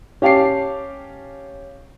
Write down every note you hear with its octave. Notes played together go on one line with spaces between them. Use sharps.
C#4 G4 F5 A5 D6 C7